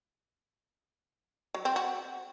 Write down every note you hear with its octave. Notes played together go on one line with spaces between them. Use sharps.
F#3
C4
F#4